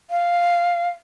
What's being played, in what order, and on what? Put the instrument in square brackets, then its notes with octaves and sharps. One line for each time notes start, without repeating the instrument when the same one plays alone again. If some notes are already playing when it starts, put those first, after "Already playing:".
[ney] F5